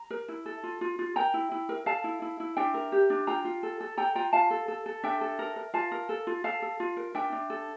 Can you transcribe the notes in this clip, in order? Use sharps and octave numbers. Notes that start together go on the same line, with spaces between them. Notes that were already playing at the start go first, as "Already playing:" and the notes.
Already playing: A#5
A#4
E4
A4
F4
F4
F4
A#4 G5 A#5
E4
E4
A#4
A4 F5 A5
E4
E4
E4
D4 E5 G5
A#4
G4
D4
F4 G5 A#5
F4
A4
A4
A4 G5 A#5
F4 G5 A#5
F4 F5 A5
A4
A4
A4
D4 E5 G5
A4
A#4
A#4
F4 F5 A5
A#4
A4
F4
A4 F5 A5
A4
F4
A#4
D4 E5 G5
D4
A4